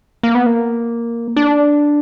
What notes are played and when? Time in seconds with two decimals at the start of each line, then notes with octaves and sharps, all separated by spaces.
0.23 A#3
0.35 B3
0.46 A#3
1.36 D4